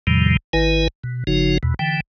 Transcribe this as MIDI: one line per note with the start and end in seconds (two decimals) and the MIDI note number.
0.07 0.37 40
0.07 0.37 45
0.07 0.37 48
0.07 0.37 51
0.07 0.37 53
0.07 0.37 55
0.53 0.88 32
0.53 0.88 51
0.53 0.88 64
0.53 0.88 71
0.53 0.88 80
1.04 1.24 47
1.27 1.58 30
1.27 1.58 49
1.27 1.58 53
1.27 1.58 63
1.27 1.58 66
1.63 1.74 40
1.63 1.74 47
1.79 2.00 50
1.79 2.00 52
1.79 2.00 79